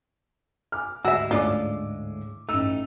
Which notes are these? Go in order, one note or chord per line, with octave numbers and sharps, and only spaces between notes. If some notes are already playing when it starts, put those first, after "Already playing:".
G#5 D6 F6
D2 G#2 G#3 F#4 E5 G#5 E6
A2 A3 C#4 D4 F4 D6
A1 A3 D#4 E6